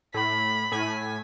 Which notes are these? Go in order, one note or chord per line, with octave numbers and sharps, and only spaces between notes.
A2 B5
A2 G#5 B6